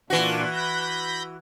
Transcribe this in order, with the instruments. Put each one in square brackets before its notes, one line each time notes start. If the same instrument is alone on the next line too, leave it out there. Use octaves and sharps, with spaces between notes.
[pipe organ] A#2 D4 F4 [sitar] E3 F#4
[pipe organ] B5 G6 A#6